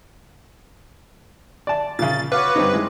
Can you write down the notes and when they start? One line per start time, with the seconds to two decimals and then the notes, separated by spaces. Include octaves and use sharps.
1.67 D5 A5
1.99 A#2 C#3 A6
2.32 F#4 B4 C#5 F5 D6
2.56 G2 C4 D#4
2.72 D#3 G#3 E4